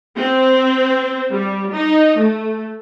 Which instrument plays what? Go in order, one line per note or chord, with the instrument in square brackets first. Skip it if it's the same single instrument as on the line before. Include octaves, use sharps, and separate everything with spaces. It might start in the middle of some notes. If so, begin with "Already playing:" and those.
[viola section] C4
G3
D#4
A3